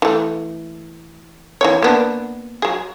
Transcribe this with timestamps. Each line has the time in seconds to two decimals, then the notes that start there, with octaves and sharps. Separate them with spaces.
0.02 E3 A3
1.61 E3 C4 C#5
1.82 A#3 B3 D4
2.62 F#3 G#4